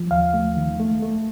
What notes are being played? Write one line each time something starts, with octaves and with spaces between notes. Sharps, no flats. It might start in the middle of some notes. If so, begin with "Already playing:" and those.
Already playing: F3
D#2 F5
A3
D#3
A3
A3